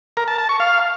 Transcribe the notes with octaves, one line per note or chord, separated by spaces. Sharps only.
A#4
A5
A5
C#6
F5